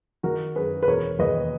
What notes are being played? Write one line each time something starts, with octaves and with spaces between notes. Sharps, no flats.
D#3 F#4 A#4
F#2 G#4 B4
B4
E1 A#4 C#5
D#2 B4 D#5